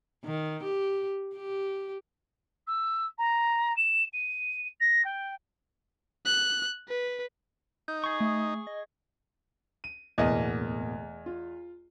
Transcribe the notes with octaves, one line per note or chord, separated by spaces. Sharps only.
D#3
G4
G4
E6
A#5
E7
D#7
A#6
G5
F#6
B4
D#4 G6
G#4 C#6
A3
D#5
D#7
D1 E2 B2 A#3 D#5
F4